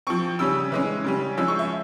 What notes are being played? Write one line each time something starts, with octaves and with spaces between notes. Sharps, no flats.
F3 C4 C#6
C#3 G3 C#4 E6
E3 G#3 C#4
C#3 G3 C#4
F3 G#3 C#4 E6
C#6
E5